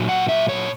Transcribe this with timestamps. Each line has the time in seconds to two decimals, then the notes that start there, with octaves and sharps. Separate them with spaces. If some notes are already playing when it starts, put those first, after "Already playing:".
Already playing: A#2 F#3
0.09 F#5
0.29 E5
0.49 C#5